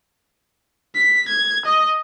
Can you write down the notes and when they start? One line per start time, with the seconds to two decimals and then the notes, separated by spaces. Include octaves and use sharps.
0.95 B6
1.28 G#6
1.65 D#5